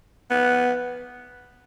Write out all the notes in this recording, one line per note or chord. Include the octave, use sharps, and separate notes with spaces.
B3